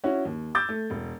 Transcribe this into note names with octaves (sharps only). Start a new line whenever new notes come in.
C#4 E4 F#4 C#5
D#2
D6 E6 G6 A6
A3
E1